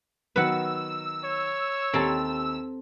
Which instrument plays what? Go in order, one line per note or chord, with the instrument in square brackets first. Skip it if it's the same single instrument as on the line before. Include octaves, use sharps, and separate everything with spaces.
[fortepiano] D#3 F#3 B3 [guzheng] B4 F#5 [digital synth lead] E6
[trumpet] C#5
[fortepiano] D#2 G4 A#5 [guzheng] C4 A4